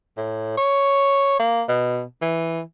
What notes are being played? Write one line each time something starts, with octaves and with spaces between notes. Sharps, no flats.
A2
C#5
A#3
B2
E3